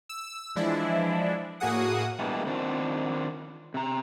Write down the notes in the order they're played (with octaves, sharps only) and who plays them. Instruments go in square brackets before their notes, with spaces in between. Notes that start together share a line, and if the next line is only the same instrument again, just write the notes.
[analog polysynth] E6
E3 F3 G#3 D4 E4
A2 A#3 F#4 G#4 F#5 D#6
[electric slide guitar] B2 E3 G3 G#3 A#3 D4
D#3 C4 D4 F4
C3 A#5